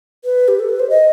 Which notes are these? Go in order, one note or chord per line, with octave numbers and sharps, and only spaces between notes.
B4
G4
A4
B4
C5
D#5